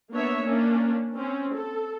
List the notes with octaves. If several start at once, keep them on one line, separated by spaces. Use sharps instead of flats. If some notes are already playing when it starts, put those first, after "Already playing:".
A#3 B3 D4 C#5 E5
A#3 C#4 D4
C4 C#4
A4